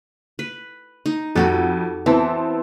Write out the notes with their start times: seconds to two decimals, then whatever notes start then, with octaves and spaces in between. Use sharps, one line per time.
0.39 B4
1.06 D#4
1.36 F2 F#4 G4 A4 F#5
2.06 E3 B3 C4 A5